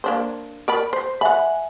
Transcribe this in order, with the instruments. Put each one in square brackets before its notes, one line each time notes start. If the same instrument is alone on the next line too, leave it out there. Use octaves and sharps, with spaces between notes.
[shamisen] A#3 D4 C5
A#4 D5 B5
C5
[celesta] E5 G#5 [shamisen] F#5 B5